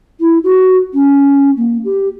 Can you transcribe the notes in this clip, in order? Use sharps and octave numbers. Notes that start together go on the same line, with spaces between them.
E4
F#4
C#4
A#3
G4